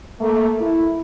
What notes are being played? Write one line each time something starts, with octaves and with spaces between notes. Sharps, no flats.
A3 A#3
E4